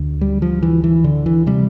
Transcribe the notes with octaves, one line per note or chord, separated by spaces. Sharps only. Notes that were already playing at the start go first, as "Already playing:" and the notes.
Already playing: D2 D3
G3
F3
E3
E3
D3
E3
C3 G3